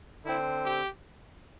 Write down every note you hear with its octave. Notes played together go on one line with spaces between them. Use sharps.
D3 C4 E4
G4